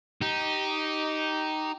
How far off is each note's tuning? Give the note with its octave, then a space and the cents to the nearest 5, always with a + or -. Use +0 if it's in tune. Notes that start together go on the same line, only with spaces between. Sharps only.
D#4 +0 G4 -15